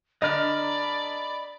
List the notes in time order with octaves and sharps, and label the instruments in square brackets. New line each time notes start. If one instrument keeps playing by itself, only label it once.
[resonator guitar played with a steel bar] D3 D4 [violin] D5 [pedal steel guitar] D#5 A#5 F6 [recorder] B5